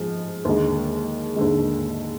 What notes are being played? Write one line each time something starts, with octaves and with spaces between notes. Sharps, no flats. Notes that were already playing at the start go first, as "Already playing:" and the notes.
Already playing: G#2 F3 G#3
D#2 D3 G#3
D#2 D3 G#3